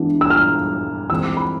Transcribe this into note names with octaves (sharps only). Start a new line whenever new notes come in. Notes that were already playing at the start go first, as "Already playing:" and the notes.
Already playing: E3 G#3 B3 D4
E6
F6
E3 G#3 C4 E6
D6
B5